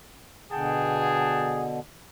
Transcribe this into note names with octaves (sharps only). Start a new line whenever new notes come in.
B2 D3 G#4 F#5 G5 A5